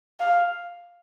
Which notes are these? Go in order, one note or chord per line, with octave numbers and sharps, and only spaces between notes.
F5